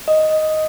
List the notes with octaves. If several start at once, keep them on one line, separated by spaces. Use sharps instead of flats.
D#5